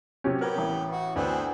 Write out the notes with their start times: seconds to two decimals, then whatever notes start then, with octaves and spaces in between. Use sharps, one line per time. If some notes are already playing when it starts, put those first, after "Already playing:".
0.24 C3 F#3 C#4 G4
0.41 B3 G4 A#4
0.58 A1
0.92 F#4
1.16 D2 B3 C4 D4